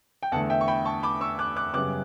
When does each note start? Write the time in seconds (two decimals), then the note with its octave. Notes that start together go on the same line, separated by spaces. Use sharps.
0.23 G5
0.32 E2 D3 A3 F#5 A5
0.50 E5 G5
0.61 C#6
0.68 G5 B5
0.85 A5 C#6
1.03 B5 D6
1.21 C#6 E6
1.39 D6 F#6
1.56 D6 F#6
1.74 F#2 C#3 G3 B3 D6 F#6